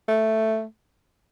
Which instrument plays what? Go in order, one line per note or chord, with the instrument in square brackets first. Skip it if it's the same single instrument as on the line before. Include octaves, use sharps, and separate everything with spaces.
[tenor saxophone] A3